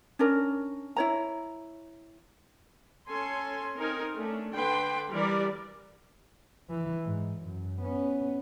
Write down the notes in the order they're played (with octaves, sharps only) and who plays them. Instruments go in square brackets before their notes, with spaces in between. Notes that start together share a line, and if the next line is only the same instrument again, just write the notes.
[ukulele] C#4 D4 A#4
E4 C#5 A#5
[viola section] C#4 A4 G#5 C6
C4 D#4 A#4 G#5
A3 C#4 D4
D3 D4 B4 G5 C6
E3 G3 G4 A#4 D5
[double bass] E3
G#2
F#2
B3 C#4